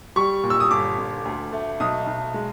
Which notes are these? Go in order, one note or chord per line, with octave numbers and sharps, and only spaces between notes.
G3 C#6
A#2
E6
D#6
G1 D6
G1
D2
A3
B1 D#6
B1
G#3